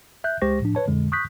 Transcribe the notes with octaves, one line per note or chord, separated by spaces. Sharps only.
E5 F#6 G6
C#2 G#3 G4 C5 C#6 A#6
A2 F3 D4
B4 C#5 A5
F2 A#2 D3 G#3
C#6 D#6 F#6 G6 B6